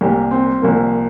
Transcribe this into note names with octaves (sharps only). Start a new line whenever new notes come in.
C2 A#2 G3 G4
C4
C2 A#2 F3 A#3